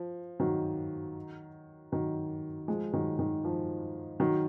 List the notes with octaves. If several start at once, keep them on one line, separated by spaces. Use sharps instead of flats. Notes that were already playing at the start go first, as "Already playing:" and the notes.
Already playing: F3
D#3 F#3
D#3 F#3
F3 G#3
D#3 F#3
D#3
F3
D#3 F#3